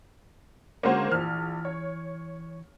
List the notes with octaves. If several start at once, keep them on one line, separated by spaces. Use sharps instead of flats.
D3 G#3 A#3 C#4 F#4 C5
A#1 E3 F6
C#5